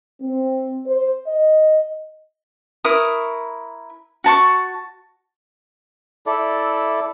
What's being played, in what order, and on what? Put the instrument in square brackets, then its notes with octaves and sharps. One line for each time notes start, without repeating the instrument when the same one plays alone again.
[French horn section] C4
C5
D#5
[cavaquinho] E4 A#4 C#6 D#6
F#4 A5 C#6
[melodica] E4 A4 D5